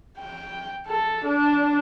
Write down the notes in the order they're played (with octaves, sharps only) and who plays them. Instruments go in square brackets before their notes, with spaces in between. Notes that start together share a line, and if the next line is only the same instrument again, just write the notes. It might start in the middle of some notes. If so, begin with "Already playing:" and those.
[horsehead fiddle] G5
A4
D4